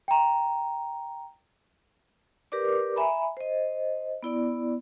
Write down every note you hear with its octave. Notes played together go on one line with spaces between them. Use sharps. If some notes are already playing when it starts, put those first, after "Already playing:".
G5 A#5
G4 A#4 B4 D5 D6
E5 G#5 A#5 B5
C5 D#5
B3 E4 D5